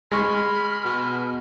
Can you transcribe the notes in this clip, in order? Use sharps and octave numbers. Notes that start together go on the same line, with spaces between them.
G#3 B5 C#6 F6
B2